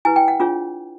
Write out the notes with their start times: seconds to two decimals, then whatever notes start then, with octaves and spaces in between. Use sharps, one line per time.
0.05 E4 G4 B4 G#5
0.16 G5
0.28 F#5
0.40 D4 F4 G#4 C#5